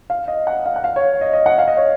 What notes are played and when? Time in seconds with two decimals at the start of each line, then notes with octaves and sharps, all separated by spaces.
0.10 F5
0.28 D#5
0.47 F#5
0.66 F5
0.76 F#5
0.84 F5
0.96 C#5
1.21 D#5
1.33 D#5
1.46 F#5
1.58 F5
1.68 D#5
1.77 C#5